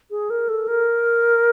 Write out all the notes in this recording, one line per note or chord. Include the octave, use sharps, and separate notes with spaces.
G#4
A#4
A4
A#4